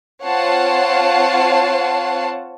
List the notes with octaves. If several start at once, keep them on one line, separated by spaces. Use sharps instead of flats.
C4 F4 C#5 F#5 A5 C7